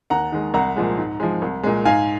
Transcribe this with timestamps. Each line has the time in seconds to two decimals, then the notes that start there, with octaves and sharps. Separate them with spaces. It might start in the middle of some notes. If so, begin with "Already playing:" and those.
0.10 D#2 F#5 A#5
0.32 D#3 G#3
0.54 C2 F#5 A#5
0.76 A#2 F3 G#3
0.98 G#2
1.20 F3 G#3
1.42 C2
1.63 A#2 G#3
1.85 G#2 F5 G#5